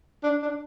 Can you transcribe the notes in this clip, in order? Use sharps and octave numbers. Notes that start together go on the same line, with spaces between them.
D4
D4